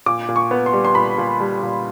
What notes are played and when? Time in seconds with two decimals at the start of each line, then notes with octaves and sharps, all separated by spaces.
0.06 A#2 D6
0.29 A#2
0.36 C#6
0.51 B3
0.66 C6
0.73 G3
0.85 C6
0.95 A#2 B5
1.18 A#2
1.40 G3
1.63 A#2